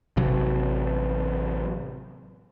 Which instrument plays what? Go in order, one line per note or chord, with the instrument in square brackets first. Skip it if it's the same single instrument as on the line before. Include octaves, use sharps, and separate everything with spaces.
[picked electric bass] A1 C3 F#3